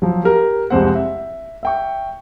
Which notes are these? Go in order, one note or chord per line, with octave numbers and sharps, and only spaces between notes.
F3 F#3
G4 A#4
C2 F2 G#3 C4 C5 F#5
E5
E5 G5 C#6